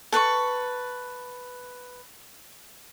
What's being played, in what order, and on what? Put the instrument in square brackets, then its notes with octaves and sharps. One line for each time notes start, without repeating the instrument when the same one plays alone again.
[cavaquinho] A4 B4 C6 C#6